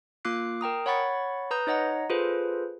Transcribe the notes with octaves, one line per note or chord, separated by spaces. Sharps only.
A#3 F4 D6 F#6 C7
A#4 G5 A#5 D#6
C#5 F#5 B5 C#6 A6
B4 A#5 D#6 G6
D#4 C#5 D#5 F#5 A#5
F4 G#4 A4 B4 C5